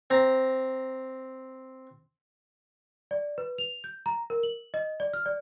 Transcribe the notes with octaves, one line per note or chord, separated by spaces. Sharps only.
C4 A#5
D5
B4
F7
G6
A#5
A#4
F#7
D#5
D5
F6
D5